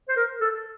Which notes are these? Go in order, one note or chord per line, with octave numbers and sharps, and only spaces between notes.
C5
A#4
A4